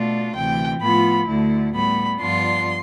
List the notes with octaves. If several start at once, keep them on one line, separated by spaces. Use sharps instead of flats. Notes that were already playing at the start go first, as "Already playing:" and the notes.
Already playing: B2 A3 D4 F4
D2 C3 E3 G5
A2 F3 B3 F4 B5
D2 D3 A3 E4
A2 G3 B3 B5
G2 F3 B3 D4 F4 C6